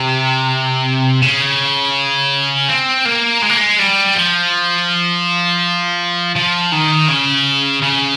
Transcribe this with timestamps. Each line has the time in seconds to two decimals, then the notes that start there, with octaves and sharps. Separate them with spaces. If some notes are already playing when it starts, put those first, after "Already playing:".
Already playing: C3
1.22 C#3
2.69 C4
3.05 A#3
3.42 G#3
3.50 A#3
3.57 G#3
3.79 G3
4.15 F3
6.36 F3
6.72 D#3
7.08 C#3
7.82 C#3